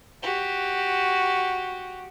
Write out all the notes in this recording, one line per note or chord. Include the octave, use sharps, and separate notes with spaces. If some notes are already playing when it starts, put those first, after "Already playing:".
F#4 G4